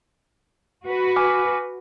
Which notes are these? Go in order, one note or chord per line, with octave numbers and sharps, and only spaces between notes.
F#4 B4
G#5 D6 F6